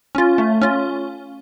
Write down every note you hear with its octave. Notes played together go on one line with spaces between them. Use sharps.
C#4 F4
A3
C#4 F4